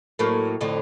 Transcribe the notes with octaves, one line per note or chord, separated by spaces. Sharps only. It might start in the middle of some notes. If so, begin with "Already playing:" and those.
A2 F#3 A#3
F2 A2 D3